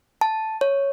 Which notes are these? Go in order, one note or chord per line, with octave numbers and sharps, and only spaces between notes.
A5
C#5